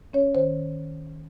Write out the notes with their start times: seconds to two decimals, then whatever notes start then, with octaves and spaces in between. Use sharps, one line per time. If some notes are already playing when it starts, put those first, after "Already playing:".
0.13 C#4 C#5
0.35 D#3 C5